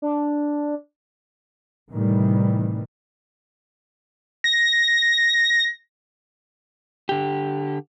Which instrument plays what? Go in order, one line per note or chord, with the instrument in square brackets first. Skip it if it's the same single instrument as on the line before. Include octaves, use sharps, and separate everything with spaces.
[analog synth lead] D4
[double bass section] A2 C3 D#3 E3 G3
[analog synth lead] A#6
[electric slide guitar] D3 G4